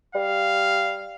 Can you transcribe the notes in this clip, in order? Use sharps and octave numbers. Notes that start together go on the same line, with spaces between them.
G3 F5